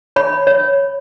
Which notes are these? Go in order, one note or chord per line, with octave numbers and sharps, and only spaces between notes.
C#5 B5
C#5